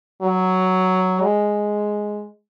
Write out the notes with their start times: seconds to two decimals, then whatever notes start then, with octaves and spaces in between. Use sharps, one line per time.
0.22 F#3
1.22 G#3